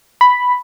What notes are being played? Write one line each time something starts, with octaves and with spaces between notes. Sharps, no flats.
B5